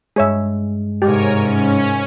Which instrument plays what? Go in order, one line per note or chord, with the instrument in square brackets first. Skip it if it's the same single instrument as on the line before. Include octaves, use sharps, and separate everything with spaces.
[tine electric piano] G2 G#3 [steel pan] G#4 C#5 E5
[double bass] G#2 C3 [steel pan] G4 [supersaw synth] A#4 C#5 G#5
[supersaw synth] C#4